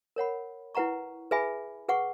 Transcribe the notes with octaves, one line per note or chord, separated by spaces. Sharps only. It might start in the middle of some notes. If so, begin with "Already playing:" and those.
A#4 C#5 F#5 B5
E4 B4 F#5 A#5 C#6
G#4 B4 E5 G#5 B5
G#4 B4 F#5 C#6